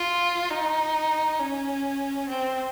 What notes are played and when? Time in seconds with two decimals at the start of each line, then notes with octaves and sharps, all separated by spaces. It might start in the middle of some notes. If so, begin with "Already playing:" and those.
Already playing: F4
0.51 D#4
1.40 C#4
2.29 C4